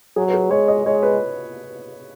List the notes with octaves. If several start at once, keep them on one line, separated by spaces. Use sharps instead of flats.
F#3 G#4
B4
G#4
G#3 C#5
D#5
G#3 C#5
B4